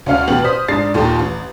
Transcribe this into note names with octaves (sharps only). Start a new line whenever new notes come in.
D2 C#4 F5 F6
A1 B2 G4 B4 F#7
C5 D#6 B6
G#2 D4 A6 C7
D#2 A#2 D#3 A4
A1